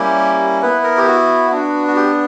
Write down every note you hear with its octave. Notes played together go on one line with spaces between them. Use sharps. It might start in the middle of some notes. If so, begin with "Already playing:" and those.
Already playing: G3 A#3 C#4 E4 G4
B3 E4 B4
A#4
G4
F#4
B3 D4 F#4
F#4
G4